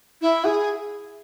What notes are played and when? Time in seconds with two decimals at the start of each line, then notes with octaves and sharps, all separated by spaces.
0.21 E4
0.44 G#4